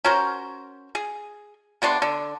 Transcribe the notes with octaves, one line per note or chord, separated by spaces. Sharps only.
C#4 F#4 A#4 C5
G#4
C3 B3 D4 C6
D3